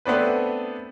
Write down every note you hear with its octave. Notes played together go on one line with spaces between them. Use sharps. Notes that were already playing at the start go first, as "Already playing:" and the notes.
A3 B3 C4 D4 B4